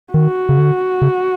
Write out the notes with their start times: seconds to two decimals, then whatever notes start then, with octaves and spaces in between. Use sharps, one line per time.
0.13 D#3 F#4
0.49 C#3
0.58 D3
1.02 C#3